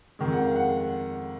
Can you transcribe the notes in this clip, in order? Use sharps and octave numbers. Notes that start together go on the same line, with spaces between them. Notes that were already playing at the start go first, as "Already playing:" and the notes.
F2 D#3 G#3
F#5
F5
F#5